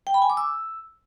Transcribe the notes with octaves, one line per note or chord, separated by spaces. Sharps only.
G5
B5
G#5
D6
E6